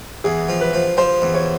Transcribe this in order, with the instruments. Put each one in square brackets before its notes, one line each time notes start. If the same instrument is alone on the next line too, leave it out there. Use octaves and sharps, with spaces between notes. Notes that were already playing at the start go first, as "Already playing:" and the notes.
[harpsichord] E2 [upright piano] G#4
[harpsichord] F3
[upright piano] B4
[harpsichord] F3
[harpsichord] F3 [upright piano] C5
[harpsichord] E2
[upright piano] C#5